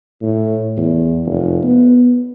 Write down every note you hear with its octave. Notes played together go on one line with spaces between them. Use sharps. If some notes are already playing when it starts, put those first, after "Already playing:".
A2
E2
F1
B3